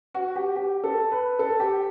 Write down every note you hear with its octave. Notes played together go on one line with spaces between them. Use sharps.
F#4
G4
G4
A4
B4
A4
G4